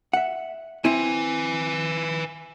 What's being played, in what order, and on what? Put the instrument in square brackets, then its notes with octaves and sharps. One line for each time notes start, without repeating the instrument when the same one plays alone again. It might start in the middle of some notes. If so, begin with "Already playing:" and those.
[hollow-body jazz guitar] E5 F#5
[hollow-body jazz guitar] C4 E4 [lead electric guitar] B4 G#5